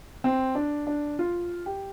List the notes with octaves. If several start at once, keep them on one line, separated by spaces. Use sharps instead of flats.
C4
D4
D4
F4
G4